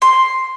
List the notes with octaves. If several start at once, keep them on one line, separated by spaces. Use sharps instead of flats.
C6